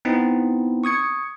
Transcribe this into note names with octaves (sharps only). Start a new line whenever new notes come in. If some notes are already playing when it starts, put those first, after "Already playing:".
B3 C4 D#4 E4
C#6 D#6 G#6 C#7